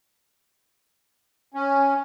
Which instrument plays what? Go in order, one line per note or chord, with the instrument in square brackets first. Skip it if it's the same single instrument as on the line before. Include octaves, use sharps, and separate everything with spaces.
[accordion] C#4